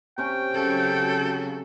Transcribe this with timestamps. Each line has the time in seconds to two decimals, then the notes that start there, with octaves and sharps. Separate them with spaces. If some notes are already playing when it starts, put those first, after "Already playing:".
0.18 C3 C#4 G5 C#6
0.54 C#3 F#3 F#4 A4